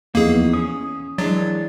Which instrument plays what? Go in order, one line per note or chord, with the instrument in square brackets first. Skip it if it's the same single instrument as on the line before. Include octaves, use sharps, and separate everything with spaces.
[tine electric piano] D#2 F3 B3 [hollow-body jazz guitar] E3 D#4 [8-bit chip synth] A#3 G#4
[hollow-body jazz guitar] C#4 [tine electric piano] D#6
[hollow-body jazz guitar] E3 G#3 D4 [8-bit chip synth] F#3 [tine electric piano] A6